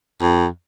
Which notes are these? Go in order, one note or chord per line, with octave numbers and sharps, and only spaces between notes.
F2